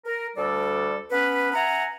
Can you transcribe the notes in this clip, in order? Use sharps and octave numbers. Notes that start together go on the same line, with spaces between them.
A#4
D2 G3 A4 D5
B3 C#4 B4
E5 F#5 G#5 A#5